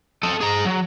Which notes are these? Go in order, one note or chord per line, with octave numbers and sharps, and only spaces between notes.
A4 D#5
G#4 A#5
F#3